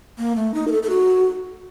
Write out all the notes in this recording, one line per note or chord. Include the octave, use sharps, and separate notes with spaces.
A#3
A3
D#4
A#4
A4
A4
F#4